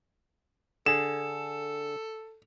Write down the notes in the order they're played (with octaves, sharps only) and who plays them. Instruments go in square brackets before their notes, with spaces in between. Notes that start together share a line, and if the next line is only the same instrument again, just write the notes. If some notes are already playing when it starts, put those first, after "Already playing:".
[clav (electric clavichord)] D3 G#4 [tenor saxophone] A4 [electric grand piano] E7